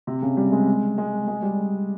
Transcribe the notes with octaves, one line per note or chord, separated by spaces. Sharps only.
C3
C#3
G3
G#3
G#3
G#3
G3